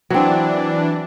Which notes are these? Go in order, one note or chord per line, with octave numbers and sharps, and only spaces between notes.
E3 F#3 C4 D4